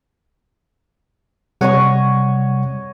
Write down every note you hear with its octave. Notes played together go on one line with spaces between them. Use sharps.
C3 G3 C#5 D#5 F#5 C#6